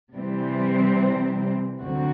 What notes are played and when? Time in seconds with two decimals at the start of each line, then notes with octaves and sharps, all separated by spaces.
0.14 C3 E3 G3 C4
1.82 D2 D3 F#3 C4 F#4